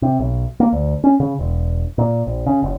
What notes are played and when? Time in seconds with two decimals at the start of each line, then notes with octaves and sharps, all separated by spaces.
0.02 C3
0.19 B1
0.60 A#3
0.73 D2
1.04 C#4
1.20 C#3
1.39 E1
1.98 A#2
2.27 A#1
2.46 C#3
2.63 F#1